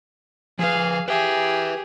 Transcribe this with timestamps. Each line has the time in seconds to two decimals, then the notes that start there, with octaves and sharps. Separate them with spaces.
0.59 F3 G#4 B4 F5
1.08 G4 G#4 B4 E5